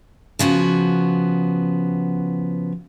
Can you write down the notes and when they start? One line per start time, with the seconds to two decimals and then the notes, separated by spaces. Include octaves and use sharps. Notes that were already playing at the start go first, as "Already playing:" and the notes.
0.39 C#3 F3 B3 F#4